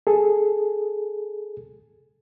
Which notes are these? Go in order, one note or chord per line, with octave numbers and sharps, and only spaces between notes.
G#4 A4